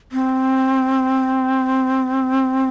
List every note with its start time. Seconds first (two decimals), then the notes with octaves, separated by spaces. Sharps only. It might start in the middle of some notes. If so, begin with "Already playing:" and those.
0.12 C4